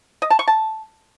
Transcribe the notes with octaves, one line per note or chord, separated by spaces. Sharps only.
D#5
A5
C#6
A5